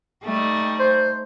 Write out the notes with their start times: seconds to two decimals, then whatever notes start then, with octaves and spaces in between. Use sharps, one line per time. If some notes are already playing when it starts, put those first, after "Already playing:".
0.24 G3 A3 D#4
0.80 C5